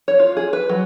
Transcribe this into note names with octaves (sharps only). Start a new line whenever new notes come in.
C#5
F4
G#4
B4
F#3